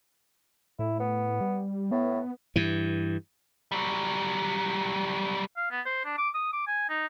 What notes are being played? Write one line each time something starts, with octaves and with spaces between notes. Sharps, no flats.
A2 E4
B3
G3
A2 B3
G2 E3
F#3 G3
F5
B3
C5
D4
D6
D#6
D6
G#5
D#4